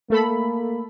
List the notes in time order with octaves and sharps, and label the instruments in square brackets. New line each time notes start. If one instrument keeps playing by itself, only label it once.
[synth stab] A3 A4 B5 [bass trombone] A#3